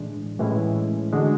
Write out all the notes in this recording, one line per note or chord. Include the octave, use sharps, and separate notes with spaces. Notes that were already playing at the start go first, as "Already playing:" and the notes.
Already playing: A2 E3 G#3 D4
A2 E3 G#3 C#4 E4
D3 G#3 D4 F#4